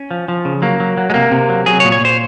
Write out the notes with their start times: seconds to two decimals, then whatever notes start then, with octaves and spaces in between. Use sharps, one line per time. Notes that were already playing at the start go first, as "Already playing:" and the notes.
Already playing: C#4
0.11 F3
0.28 F3
0.45 C#3
0.62 F#3 A#3
0.80 F#3
0.97 F#3
1.10 G#3
1.14 C3 A#3
1.31 C3
1.49 F#3
1.66 F#3 G#4
1.80 C#5
1.84 A#2
1.92 C#5
2.01 A#2 C5